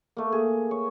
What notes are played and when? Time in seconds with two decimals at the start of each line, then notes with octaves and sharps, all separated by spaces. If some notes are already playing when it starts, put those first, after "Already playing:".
0.17 A3 A#3
0.32 G#4
0.71 C#5